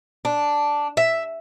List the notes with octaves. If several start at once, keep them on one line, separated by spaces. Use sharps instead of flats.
D4
E5